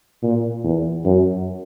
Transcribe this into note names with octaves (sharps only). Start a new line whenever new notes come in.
A#2
E2
F#2